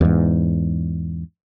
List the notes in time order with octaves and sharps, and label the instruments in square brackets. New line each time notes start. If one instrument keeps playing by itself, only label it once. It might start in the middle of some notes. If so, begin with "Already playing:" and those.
[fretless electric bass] E2 G#2